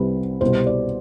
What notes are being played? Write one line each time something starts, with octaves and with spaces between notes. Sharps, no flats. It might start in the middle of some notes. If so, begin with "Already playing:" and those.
Already playing: C2 C3 G3 B4
C2 B2 G3 C5
D5